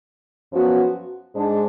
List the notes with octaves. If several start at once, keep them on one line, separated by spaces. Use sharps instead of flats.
F#2 F3 B3 F#4
G#2 G#3 D4